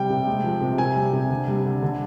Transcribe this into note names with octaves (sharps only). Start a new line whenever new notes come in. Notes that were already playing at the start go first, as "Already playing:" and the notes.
Already playing: C3 G3 G5
C3
G#3
F3
C3
C3 G#5
G3
C3
D3
G3
D3
D3